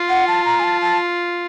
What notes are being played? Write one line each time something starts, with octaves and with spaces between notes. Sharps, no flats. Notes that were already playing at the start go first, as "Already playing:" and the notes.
Already playing: F4
F#5
A5
A#5
G#5
A5
A5